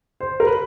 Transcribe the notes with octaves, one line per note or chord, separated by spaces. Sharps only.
C5
A#4
B4